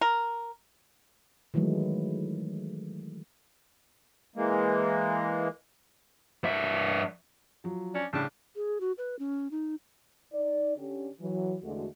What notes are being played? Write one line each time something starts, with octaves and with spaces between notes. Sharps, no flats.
A#4
D#3 E3 F#3 G#3 A3
E3 G#3 A#3
G2 E5
F3 F#3
C#4 D4 D5
A2 C#3 G3 D4
G#4
F#4
B4
C#4
D#4
D#4 D5
D3 C#4 G4
E3 F#3
E2 D3 G#3 A3 F#4